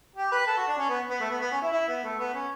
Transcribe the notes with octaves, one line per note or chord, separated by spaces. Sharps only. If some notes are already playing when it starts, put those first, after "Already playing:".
G4
B4
A4
F#4
D4
C#4
B3
B3
A3
B3
B3
C#4
E4
E4
B3
A3
B3
C#4